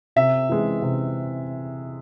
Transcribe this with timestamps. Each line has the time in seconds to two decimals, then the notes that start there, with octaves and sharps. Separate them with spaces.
0.16 C3 E5
0.49 E3 G#3
0.82 C3